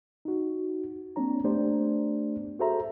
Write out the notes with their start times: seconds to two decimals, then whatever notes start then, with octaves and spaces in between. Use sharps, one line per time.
0.25 D#4 F#4
1.16 A#3 C4 D4 C#5 A#5
1.44 A3 B3 D4 G4 C5 D5
2.59 F#4 G#4 A4 C5 E5 A#5